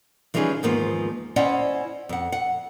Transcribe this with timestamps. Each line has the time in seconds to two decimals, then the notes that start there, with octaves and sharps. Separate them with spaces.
0.34 E3 F3 G3 C#4 D#4 G#4
0.63 E2 G#2 D#3 F3 A#3 B3
1.36 C#4 E4 C5 D5 D#5 F#5
2.09 F2 F#5
2.32 F#5